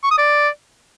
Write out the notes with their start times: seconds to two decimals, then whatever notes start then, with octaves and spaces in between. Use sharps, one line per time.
0.04 C#6
0.11 D#6
0.18 D5